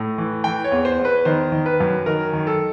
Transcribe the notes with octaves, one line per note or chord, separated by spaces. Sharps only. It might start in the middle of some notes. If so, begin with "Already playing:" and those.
Already playing: A2
E3
E3 G5
C#5
E2
C5
E2
B4
D#3 C5
D#3
B4
F#2
D#3 A#4
D#3
A4